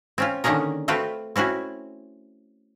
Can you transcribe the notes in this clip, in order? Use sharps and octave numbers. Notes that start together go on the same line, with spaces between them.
C4 C#4 F4
D3 D#3 A#3 C#4 G#4 A#4
A3 C4 F4 F#4 B4 G5
C4 C#4 E4 F#4